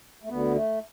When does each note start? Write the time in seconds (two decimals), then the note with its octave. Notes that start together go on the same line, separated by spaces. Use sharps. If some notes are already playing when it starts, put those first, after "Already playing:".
0.23 A3
0.29 D2 D3 B3
0.56 A3